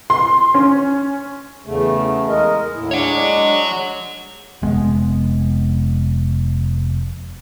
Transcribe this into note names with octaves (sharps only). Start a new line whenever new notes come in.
C6
C#4
E2 C#3 A3
G#3 A#4 D#5
D#2 A2 E4
G#3 D4 C#5 F#5
F1 G#3 B3